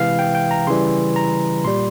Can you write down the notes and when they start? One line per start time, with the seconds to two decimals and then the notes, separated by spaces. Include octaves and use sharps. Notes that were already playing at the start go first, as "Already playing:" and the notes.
Already playing: C3 E3 G#3 F5
0.19 G5
0.35 G5
0.51 A#5
0.67 C#3 E3 G3 C6
1.16 A#5
1.65 A#2 G3 C6